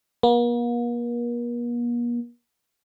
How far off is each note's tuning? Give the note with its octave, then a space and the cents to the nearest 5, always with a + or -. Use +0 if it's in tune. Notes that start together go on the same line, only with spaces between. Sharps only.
A#3 +45